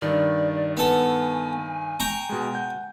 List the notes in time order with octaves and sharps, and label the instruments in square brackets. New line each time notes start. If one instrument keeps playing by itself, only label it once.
[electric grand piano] G2 D#3 [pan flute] D5
[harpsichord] B3 A4 [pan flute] G#5
[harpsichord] G5 A#5 C#6
[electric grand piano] B2 G#3
F#5 G6